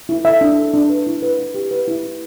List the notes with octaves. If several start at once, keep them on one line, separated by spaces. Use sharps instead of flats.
E4
A4 E5
D4
A4
D4
B4
E4
B4
E4
G4
B4
E4
E4